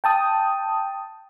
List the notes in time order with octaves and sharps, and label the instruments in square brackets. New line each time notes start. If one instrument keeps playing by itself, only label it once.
[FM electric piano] G5 A5 D#6